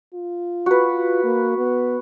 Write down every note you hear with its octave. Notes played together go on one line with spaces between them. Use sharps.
F4
F#4 B4
A#3
B3